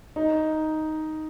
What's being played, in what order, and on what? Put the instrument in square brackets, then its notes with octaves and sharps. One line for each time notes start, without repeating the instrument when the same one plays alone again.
[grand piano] D#4